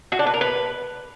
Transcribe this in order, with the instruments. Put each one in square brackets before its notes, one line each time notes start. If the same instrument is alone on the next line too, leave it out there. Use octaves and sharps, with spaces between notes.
[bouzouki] F#4
D4
B4
A#4
B4